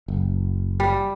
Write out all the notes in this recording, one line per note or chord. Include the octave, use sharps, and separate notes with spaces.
F#1
G3